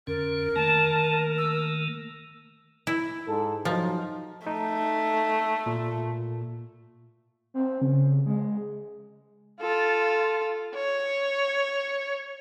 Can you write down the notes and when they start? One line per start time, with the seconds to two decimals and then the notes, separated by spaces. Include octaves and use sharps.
0.07 F2 D3 C#4 A#4
0.56 D#3 A3 A#3 A5
1.38 E6
2.87 E4
3.27 G#2 A4
3.65 F3 F#3 D#4
4.47 A3 D#4
5.66 A#2
7.54 C4
7.81 C#3
8.26 G#3
9.61 F4 A4
10.75 C#5